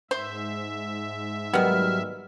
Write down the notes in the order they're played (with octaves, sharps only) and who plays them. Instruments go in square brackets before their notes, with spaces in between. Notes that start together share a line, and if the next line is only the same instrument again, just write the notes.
[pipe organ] G#2 E5 [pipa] C5
[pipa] D#3 B3 [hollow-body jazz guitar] F#3 G3 [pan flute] F6